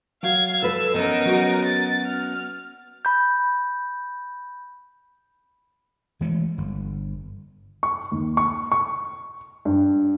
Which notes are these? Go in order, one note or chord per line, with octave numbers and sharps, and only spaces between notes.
F#3 F5 G#6
A4 B4 E6
B3 C#4 D#4 A#4
F#3 F#4
A6
F6
B5 G6
E3 G#3 A3
G1
C#6
D#2
C#6
C#6
G2